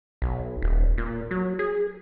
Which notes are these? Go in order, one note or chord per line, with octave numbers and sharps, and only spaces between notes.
B1
D#1
A#2
F#3
G#4